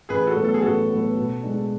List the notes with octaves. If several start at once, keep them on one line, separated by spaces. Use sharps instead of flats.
A1 G#4 B4
F#4 A4
A2 F#3 B3
A4
G#4
A1 F#4 A4
A2 F#3 B3
B2
G#3 D4